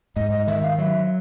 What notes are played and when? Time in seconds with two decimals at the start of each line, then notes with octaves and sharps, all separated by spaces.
0.16 G#2 D#5
0.31 D#5
0.47 D#3 E5
0.63 F5
0.78 F#3 E5